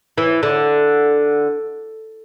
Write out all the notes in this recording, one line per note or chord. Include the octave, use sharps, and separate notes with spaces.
E3
D3